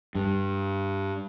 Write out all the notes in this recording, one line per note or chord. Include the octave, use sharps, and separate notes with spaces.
G2